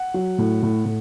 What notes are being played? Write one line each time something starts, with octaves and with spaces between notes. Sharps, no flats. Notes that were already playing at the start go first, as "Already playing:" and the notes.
Already playing: F#5
F#3
A2
A2
A2